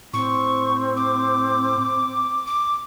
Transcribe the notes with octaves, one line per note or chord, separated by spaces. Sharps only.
A2 C4 C#6
D6
D6